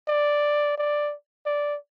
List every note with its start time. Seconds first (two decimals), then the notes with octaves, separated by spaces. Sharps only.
0.08 D5
0.78 D5
1.46 D5